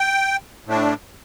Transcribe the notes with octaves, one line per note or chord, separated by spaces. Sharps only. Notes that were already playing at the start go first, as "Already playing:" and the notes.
Already playing: G5
A2 A3 D4